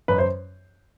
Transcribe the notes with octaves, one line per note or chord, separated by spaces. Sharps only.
F#2 B4
C5